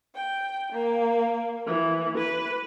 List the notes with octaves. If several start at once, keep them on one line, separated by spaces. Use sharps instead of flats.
G5
A#3
E3
B4